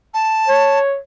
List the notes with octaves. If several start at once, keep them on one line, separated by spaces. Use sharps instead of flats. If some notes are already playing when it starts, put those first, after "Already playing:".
A5
C#5